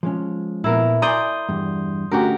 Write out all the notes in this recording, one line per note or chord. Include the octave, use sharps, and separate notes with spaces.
F3 G#3 C#4
A#2 B3 E4 A#4
D5 G#5 A#5 C6 D#6 G6
E2 G2
D3 A3 C#4 F#4 G4 A#4